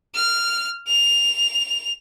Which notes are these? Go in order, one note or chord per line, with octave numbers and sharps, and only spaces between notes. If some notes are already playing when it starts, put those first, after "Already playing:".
F6
F7